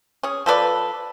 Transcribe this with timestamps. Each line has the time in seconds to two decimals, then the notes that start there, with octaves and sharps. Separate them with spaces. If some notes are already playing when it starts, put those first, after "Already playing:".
0.23 C#4 G#4
0.46 F3 A4 B4 D5